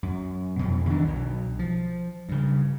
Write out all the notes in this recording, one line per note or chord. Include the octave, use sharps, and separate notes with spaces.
F#2
F2 B2
D#3 E3 F#3 D4
B1 B2
F3
G2 C#3